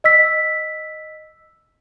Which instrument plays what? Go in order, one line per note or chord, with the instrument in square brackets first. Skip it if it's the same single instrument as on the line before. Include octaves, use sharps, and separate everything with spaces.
[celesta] D#5 E6 B6